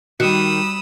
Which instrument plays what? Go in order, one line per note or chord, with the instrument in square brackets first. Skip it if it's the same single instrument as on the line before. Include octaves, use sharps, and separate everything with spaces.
[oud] D#3 [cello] G3 [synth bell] F#4 [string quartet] B5 D#6 E6